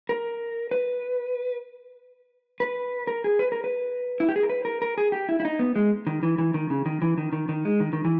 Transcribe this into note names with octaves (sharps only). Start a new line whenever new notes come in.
A#4
B4
B4
A#4
G#4
B4
A#4
B4
E4
G4
G#4
A#4
B4
A#4
A#4
G#4
G4
E4
E4
D#4
B3
G#3
D#3
E3
E3
D#3
C#3
D#3
E3
D#3
D#3
D#3
G#3
D#3
D#3
E3